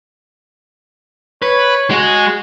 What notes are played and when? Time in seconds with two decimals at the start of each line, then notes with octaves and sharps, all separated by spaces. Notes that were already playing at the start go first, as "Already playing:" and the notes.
1.42 B4 C#5
1.90 G#3 F#4 G#4